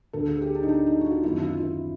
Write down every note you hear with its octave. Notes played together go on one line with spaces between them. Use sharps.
D2 D3 A4
G#4
G4
D4
D#4
D4
D#4
F#4
F4
G1 F#2 D#3 E4
F4
E4